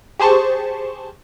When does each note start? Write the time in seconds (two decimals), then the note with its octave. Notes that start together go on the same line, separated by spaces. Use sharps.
0.20 G4 G#4 C5 A5 C#6